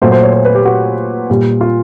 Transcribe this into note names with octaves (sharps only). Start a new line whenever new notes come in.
A#2 F#3 A3 C5
C5
C#5
C5
B4
G4
F#4
A#2 G3
F4